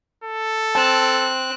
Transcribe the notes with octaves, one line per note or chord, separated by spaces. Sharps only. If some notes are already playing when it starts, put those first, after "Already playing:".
A4
C4 A5 F#6